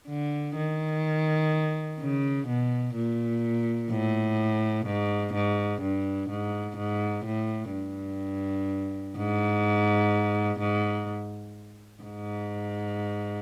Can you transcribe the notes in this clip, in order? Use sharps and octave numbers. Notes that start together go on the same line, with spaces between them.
D3
D#3
C#3
B2
A#2
A2
G#2
G#2
G2
G#2
G#2
A2
G2
G#2
G#2
G#2